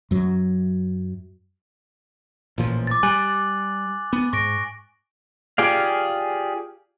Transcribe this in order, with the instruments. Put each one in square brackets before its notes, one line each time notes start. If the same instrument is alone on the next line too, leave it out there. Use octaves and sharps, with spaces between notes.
[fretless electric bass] F#2 F#3
[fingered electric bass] A1 A#2 F3
[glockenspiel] D6 A6
[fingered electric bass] G3 [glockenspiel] G#5 F#6 F#7
[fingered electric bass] B3
[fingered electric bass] G#2 [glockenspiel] C#6 A#6 D7
[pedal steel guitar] F4 G4 G#4 D5 F5